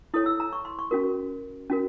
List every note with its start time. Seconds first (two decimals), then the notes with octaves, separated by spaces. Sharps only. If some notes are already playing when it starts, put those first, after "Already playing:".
0.14 E4 A4 C#5 D#6
0.26 E6
0.40 A#5
0.53 C#6
0.65 C6
0.79 C#6
0.91 C#4 F#4 A#4
1.70 C#4 F#4 A#4